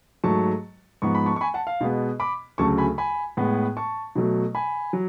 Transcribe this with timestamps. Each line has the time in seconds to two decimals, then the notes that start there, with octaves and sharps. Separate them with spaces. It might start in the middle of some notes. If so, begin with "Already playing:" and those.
0.24 G#2 F#3 A3 A5 C#6
1.02 G#2 F3 B3 C#6
1.15 B5
1.26 A5 C#6
1.36 C#6
1.41 G#5 B5
1.54 F#5 A5
1.67 F5
1.81 B2 G#3 B3
2.20 B5 D6
2.58 D2 C#3 F#3 A3 A5 C#6
2.78 G#5 B5
2.98 G#5 B5
3.37 A2 G#3 B3
3.77 A5 C#6
4.15 B2 F#3 A3
4.55 G#5 B5
4.93 F#3